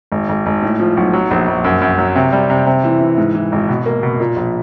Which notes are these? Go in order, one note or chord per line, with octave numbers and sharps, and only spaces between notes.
G#1
G#1
G#1
A2
F3
B1
F#3
A#1
A#1
F#2
F#2
F#3
C3
G3
C3
C3
E3
E3
G#2
E3
G#1
B2
A#3
B2
A#2
A#1